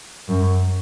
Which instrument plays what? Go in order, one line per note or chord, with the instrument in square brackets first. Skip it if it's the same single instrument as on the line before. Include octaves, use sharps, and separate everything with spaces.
[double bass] F#2